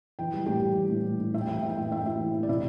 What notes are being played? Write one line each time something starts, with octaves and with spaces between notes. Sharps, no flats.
E3 G5
G3
A2 G4 G5
G3
E3
A2
A2
A2
A2 E5
G5
E3 E5
G5
E3 E5
G5
A2 E5
G5
A2 E5
G5
A2 E4 E5
E3
A2
D5
C3 E4 E5